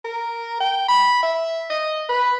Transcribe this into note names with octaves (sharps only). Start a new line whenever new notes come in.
A#4
G5
B5
E5
D#5
B4